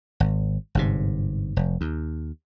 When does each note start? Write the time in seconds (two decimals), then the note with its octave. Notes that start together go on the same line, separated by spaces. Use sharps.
0.20 G#1
0.75 G1 G#2 C3
1.56 F1
1.81 D#2